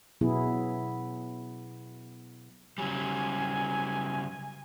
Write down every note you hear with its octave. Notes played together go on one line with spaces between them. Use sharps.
B2 F#3 B3 E4 G#4
C#3 F#3 G3 G#5